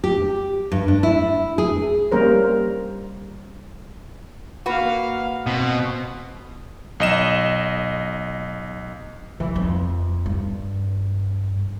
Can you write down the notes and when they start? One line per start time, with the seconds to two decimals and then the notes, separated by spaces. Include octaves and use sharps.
0.04 G4
0.72 G2
0.88 D4
1.03 E4
1.58 G#4
2.12 G3 A#3 C#4 A#4 C5
4.66 A#3 F#4 B4 F5
5.47 B2 C4
7.00 B1 D#5 E7
9.40 E3
9.55 F2
10.26 G2